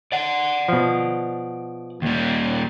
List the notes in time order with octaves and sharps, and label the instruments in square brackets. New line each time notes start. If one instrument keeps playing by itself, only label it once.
[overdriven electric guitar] D5 F#5
[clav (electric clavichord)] B2 F3
[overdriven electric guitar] D#2 G3